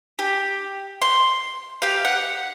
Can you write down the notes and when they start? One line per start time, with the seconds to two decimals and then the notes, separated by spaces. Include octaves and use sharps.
0.19 G4
1.02 C6
1.82 G4 F5
2.05 F#5